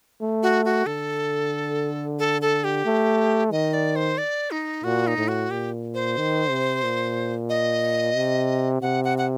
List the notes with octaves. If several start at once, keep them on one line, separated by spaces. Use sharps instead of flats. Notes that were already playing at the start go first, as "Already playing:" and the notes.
A3
F#4
F#4
D3 A4
A4
A4
G4
A3
D#3 D#5
D5
C5
D5
D#4
A#2 F#4
D#4
A2
F#4
A#2 G4
C5
D#3
C3
A#2
D#5
C3
C3 F#5
F#5
F#5